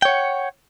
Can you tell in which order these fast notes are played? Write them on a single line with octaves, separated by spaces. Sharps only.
G5 C#5 F#5